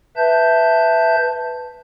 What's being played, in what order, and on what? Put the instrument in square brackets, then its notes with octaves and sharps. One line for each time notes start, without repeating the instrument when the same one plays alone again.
[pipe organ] B4 E5 A5 G6